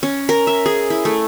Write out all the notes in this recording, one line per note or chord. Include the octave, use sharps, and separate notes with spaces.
C#4
A#4
E5
G#4
E4
A3